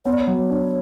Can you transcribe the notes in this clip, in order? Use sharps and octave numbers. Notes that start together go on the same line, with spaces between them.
B3 C#5
D5
C#5
F#3
D4